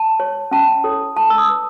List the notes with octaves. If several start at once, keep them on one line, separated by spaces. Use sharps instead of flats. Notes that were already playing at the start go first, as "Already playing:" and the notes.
Already playing: A5
C#5
C#4 A5
E4 A4 C#5
E4 A5
E6
D#6
B4